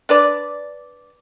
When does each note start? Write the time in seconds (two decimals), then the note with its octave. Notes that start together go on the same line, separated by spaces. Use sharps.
0.09 D4 B4 D5